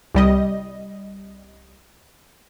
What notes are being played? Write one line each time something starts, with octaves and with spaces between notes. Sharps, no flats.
C2 G3 D#5